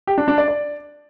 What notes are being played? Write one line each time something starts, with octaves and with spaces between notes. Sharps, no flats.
G4
D4
D4
D5
D5